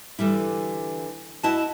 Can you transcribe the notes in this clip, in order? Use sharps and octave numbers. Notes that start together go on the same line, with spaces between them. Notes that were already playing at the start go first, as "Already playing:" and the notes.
D3 E3 G3 E4
E4 F#4 D#5 A5